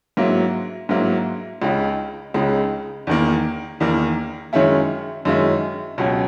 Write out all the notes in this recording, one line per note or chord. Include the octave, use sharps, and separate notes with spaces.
G#2 F#3 A#3 E4
G#2 F#3 A#3 E4
C#2 C#3 G#3 D#4
C#2 C#3 G#3 D#4
E2 D#3 A#3
E2 D#3 A#3
F#2 D#3 G#3 C#4 E4
F#2 D#3 G#3 C#4 E4
C#2 B2 F#3 C#4